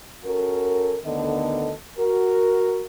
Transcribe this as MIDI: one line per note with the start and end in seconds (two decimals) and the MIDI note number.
0.25 0.97 61
0.25 0.97 66
0.25 0.97 69
0.25 0.97 70
1.05 1.72 38
1.05 1.72 50
1.05 1.72 51
1.05 1.72 59
1.05 1.72 69
1.05 1.72 75
1.98 2.86 66
1.98 2.86 70